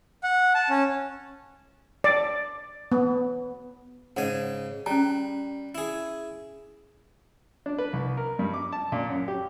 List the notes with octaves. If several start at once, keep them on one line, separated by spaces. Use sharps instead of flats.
F#5
A5
C#4
D5
B3
G#2 C#3 F#5 G#5
G3 C#4 A#5
E4 G#4
D4
B4
C2
A#4
G2
D6
A5
A#2
F#2
G4